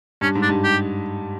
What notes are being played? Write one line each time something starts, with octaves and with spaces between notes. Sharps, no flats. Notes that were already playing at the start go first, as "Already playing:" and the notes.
G2 C#4
G#2
D4
G2
G4